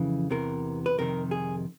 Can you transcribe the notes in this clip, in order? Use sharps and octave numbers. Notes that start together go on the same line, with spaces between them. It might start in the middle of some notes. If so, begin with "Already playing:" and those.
Already playing: F2 C#3 E3
E2 C3 E3 A#4
B4
F2 C3 D#3 A#4
G#4